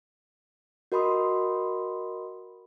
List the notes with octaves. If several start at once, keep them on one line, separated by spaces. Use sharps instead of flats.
F#4 A#4 D#5 B5 C6 D#6